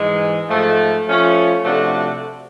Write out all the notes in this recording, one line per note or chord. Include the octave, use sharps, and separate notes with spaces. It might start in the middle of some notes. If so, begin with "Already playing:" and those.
Already playing: G#2 E3 G#3
G#2 F3 A3
F3 A3 C#4 F4
C3 F3 A3 D4 F#4